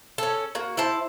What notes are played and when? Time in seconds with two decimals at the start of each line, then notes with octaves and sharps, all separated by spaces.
0.18 C#4 A4
0.55 A#3 F#4
0.77 E4 C5 A5